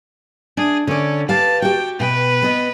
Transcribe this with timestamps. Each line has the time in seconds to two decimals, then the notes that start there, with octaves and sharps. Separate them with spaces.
0.57 D4 G#4
0.87 D3 C#4 D5
1.29 G4 B4 F5 A5
1.62 F#4 G4 G5
2.00 B2 B4 G5
2.42 B3 D#5